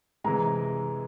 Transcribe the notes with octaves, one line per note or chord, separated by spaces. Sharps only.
C3 E3 G#3 A#5